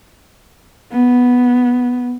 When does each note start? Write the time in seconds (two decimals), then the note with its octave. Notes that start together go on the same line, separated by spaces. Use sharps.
0.91 B3